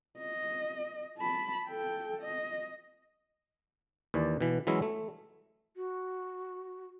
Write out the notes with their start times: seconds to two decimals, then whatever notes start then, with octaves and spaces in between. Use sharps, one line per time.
0.18 D#5
1.18 A5 B5
1.68 A4 G5
2.21 D#5
4.14 D#2 E3 D5
4.41 B2 E3
4.67 E3 F#3 G#3 C#4 E4
4.82 A3
5.77 F#4